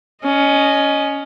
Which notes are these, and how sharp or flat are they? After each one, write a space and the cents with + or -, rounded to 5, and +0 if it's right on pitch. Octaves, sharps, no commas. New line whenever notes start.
C#4 +15 D#5 -10